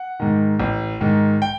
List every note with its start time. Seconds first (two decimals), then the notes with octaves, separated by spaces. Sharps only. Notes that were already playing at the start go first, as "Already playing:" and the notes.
Already playing: F#5
0.20 G#2 D#3
0.60 A1
1.01 G#2 D#3
1.42 G5